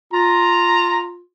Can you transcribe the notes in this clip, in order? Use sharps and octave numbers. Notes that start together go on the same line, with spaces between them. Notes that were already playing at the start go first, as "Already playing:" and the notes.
F4 A#5